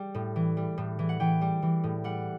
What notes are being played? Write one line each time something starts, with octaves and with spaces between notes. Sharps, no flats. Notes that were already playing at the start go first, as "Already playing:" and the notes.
Already playing: G3
A2
E3
G3
A2
E3
F#5
E3 G5
G3
E3
A2
G3 F#5